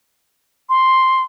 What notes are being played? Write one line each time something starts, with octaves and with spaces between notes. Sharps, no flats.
C6